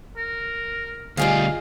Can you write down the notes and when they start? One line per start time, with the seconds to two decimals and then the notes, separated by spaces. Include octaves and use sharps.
0.17 A#4
1.17 D2 G3 F4 G#4 D#5 F5